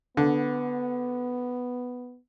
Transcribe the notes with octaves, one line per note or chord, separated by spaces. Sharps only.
D3 B3